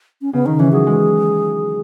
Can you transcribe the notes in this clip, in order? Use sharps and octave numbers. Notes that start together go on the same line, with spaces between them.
C#4
C#3 B3
D#3 D#4
E3 C#4
F#3 G#4
G#3